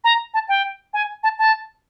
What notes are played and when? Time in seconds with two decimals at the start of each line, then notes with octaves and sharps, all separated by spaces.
0.04 A#5
0.34 A5
0.49 G5
0.94 G#5
1.23 A5
1.39 A5